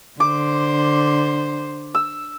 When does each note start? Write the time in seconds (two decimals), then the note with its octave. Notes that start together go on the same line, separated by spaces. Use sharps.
0.20 D3 C5 D6
1.95 E6